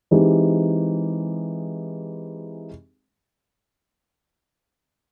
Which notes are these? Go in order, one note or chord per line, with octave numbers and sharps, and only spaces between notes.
E3 G#3 C4 D#4 G4